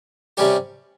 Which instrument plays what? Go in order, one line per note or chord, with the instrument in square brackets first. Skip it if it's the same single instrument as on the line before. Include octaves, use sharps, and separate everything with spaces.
[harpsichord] C3 G3 C#4 G4